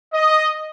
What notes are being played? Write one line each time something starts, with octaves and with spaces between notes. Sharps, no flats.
D#5